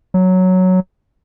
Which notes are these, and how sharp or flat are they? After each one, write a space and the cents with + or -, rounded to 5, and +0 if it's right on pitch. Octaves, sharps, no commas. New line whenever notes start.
F#3 +0